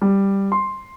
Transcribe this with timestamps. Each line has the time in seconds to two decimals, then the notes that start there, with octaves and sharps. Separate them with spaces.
0.02 G3
0.52 C6